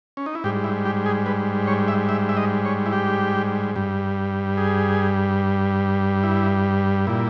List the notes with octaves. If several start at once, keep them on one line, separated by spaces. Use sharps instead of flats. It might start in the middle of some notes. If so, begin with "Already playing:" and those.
C#4
D#4
E4
G#2 G3 G4
E4
G4
G#4
B4
C#5
E5
E5
E5
D#5
C#5
E4
G4
G2 G3
G#4
E4
A#2 G3 E4